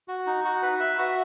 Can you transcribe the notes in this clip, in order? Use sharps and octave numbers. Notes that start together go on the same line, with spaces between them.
F#4
D#4
F#4
B4
E5
F#4